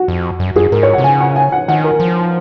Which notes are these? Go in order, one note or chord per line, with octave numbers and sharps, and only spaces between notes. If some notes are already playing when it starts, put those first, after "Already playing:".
Already playing: F#4
F2
F#2
F#2 G#4
G#2 A#4
C#5
F#5
C3
C#3 G#5
F#5
G#5
F#5
D#3 F#5
A#4
F3